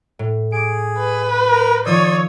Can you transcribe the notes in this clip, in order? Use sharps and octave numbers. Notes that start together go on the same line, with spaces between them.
A2
G#4 D6 D7
B4
A#4
D#3 F3 C#5 D5 D#6 E6